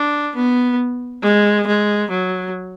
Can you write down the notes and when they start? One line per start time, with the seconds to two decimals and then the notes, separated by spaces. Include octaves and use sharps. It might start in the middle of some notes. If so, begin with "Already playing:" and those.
Already playing: D4
0.36 B3
1.23 G#3
1.67 G#3
2.10 F#3